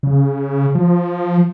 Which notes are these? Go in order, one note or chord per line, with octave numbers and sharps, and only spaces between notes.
C#3
F3